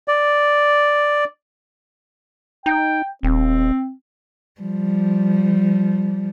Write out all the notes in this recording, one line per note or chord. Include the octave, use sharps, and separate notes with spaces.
D5
D#4 G5
D#1 C4
F3 G3